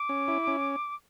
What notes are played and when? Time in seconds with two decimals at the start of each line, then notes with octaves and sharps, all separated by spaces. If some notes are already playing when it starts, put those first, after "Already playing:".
Already playing: D6
0.09 C#4
0.28 E4
0.47 C#4